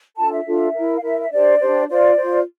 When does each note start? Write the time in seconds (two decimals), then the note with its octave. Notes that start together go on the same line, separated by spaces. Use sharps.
0.17 D4 F4 A4 A5
0.31 E5
0.45 D4 F4 A4
0.74 E4 A#4
0.97 F5
1.03 E4 A#4 E5
1.20 E5
1.31 D4 G4 C5 D5
1.60 D4 G4 C5
1.89 F4 C5 D5
2.17 F4 C5